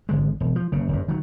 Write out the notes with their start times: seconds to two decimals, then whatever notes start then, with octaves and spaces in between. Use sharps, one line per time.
0.09 G#1 D3 G#3
0.40 E1
0.56 F3
0.72 F#1 C#3
0.88 F#1 G2
1.08 D#3 F#3